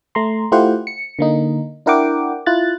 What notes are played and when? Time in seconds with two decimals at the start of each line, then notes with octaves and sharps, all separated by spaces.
0.15 A3 A#5 C6
0.52 A3 E4 F4 G4 C5 F#5
0.87 C#7
1.19 D3 A#3 D#4
1.86 D4 E4 A#4 F#5 G5 D6
2.46 E4 F4 F#6 A6